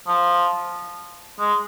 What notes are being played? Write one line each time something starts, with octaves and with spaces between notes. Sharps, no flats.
F3
G#3